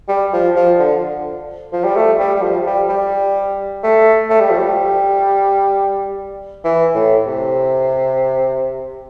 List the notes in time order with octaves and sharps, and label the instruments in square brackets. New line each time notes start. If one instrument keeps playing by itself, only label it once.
[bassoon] G3
F3
F3
D3
F3
G3
A3
G3
G3
F3
G3
G3
A3
A3
G3
F3
G3
E3
A2
C3